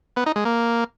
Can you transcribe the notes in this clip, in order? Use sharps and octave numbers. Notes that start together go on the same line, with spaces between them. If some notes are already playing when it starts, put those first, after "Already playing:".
B3
D#4
G#3
A#3